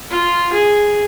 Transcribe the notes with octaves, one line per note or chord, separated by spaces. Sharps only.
F4
G#4